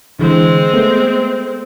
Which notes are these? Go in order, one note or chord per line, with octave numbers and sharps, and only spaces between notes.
D3 E3 G#3 C4
A3 B3